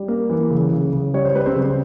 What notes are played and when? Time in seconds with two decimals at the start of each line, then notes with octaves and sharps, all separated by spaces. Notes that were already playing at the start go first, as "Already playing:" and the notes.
Already playing: G3
0.08 A#3
0.30 E3
0.50 C#3
0.72 C#3
0.93 C#3
1.14 G3 C#5
1.25 C5
1.35 G3 B4
1.46 C4 C5
1.56 C#3